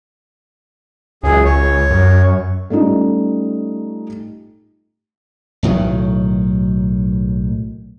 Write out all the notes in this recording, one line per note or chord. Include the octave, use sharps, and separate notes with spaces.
C#2 F#2 G#4
C#5
F#2
G3 A3 C#4 D#4 F4
B1 A2 D#3 F#3